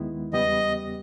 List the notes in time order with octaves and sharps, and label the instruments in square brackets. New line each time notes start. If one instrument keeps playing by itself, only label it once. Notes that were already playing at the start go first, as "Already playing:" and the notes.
Already playing: [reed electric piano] D#2 D#3 G#3 B3 E4
[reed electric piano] E2 C#3 G3 B3 G4 [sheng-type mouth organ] D#5